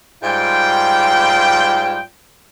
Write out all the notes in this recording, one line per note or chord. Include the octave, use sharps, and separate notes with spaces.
G#2 G3 F4 G5